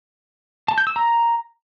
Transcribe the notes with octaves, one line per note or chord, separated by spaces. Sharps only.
A5
G6
E6
A#5